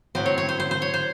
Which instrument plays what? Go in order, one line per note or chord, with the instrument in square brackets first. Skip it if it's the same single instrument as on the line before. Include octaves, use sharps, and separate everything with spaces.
[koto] A2 F#3 C4 C5
C#5
C#5
C5
C5
C5
C#5
C5